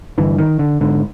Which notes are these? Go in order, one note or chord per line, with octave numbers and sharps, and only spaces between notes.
G2 D3 E3
D#3
D3
G#2 D3